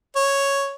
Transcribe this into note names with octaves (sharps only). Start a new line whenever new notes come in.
C#5